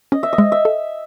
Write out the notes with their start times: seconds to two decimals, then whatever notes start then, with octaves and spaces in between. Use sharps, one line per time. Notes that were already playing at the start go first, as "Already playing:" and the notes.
0.12 C#4 D#5
0.23 E5
0.33 D#5
0.38 G#3
0.52 E5
0.65 A4